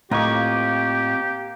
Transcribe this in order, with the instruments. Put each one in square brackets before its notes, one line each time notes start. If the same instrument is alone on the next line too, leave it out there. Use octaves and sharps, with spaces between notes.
[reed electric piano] A2 D#5 [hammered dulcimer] A#3 [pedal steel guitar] C4 F4 C#6 [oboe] G4